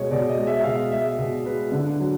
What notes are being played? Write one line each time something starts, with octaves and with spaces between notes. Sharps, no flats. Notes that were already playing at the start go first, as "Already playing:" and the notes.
Already playing: B2 G#3 C#5 D#5
B2 D5
D#5
G#3
E5
E5
B2 F5
G#3 E5
B2
G#3 B4
D3
F#3